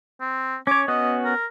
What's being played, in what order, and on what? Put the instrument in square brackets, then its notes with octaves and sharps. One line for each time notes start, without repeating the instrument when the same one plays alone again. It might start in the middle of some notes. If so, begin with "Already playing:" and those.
[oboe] C4
[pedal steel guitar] C#4 C#5 [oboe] D6
[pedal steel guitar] B3 C#4 F#4 [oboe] D#5
[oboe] A#4